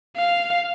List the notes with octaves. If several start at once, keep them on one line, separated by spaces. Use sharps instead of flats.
F5